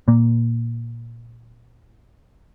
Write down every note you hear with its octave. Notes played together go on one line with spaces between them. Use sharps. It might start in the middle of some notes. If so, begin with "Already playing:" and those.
A#2 A#3